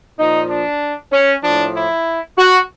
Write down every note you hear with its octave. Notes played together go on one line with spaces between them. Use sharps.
A#2 F3 D#4
D4
C#4
A2 F3 D4
E4
F#4